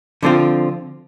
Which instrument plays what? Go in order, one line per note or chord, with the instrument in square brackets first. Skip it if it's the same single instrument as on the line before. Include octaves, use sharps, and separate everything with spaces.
[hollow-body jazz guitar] D3 F3 C4 F4